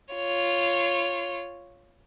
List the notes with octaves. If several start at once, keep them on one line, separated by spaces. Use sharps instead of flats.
F4 C#5